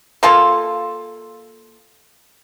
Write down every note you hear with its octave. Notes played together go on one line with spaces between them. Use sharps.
A#3 F4 A4